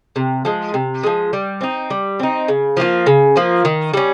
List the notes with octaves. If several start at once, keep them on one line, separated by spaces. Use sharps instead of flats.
C3
F3 G#3
C3
F3 G#3
G3
C4 D#4
G3
C4 D#4
C#3
F3 A#3 F4
C#3
F3 A#3 F4
D#3
G3 C#4